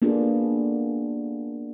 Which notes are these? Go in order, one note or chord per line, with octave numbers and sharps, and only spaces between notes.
A#3 B3 D4 F4 G#4 A4